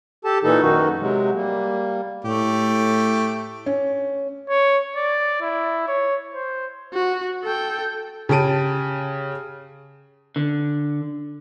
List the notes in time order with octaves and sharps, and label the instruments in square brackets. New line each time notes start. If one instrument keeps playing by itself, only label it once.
[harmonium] G4 A4 A5
A#2 E3 D#4 A4
F#2 D#3 D#4 F#4
C3 F#3 G#3
G3 A#3
[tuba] A2 [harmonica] A3 G4
[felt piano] C#4
[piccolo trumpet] C#5
D5
E4
C#5
C5
[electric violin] F#4
A4 G5
[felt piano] C#3 G4 A5 D7 D#7
[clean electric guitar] D3